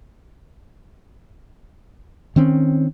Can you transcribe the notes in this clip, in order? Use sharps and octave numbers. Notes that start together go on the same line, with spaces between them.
D#3 C4 C#4